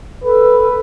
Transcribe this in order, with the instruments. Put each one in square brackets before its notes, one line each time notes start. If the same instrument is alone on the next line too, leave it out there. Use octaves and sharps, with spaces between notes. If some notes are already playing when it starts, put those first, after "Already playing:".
[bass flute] A4 [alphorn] B4